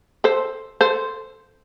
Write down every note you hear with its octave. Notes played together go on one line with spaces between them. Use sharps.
A4 C5
A4 C5